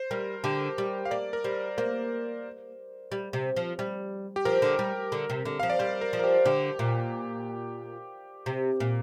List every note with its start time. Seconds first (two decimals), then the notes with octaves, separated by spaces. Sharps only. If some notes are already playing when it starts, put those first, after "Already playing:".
Already playing: C5
0.11 G3 A#4
0.44 D3 G4
0.78 G3
1.05 F5
1.11 A#3 D5
1.33 A#4
1.44 G3 C5
1.78 A#3 C5
3.12 G3
3.33 C3
3.56 F3
3.79 G3
4.36 G4
4.45 F3 A#4
4.62 D3
4.79 G3
5.12 D3
5.30 C3
5.45 D3
5.60 F3 F5
5.70 D5
5.79 G3 C5
6.01 A#4
6.13 F3
6.19 A#4
6.24 G4
6.46 D3 G4
6.79 A#2
8.46 C3
8.80 A#2